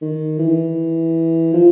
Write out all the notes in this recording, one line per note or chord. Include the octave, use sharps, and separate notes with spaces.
D#3
E3
F3